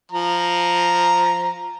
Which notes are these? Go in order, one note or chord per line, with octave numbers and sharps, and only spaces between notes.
F3 A#5